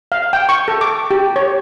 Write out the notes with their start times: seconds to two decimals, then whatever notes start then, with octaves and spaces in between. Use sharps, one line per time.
0.12 F5
0.33 G5
0.49 C#6
0.68 A4
0.81 D6
1.11 G4
1.36 C#5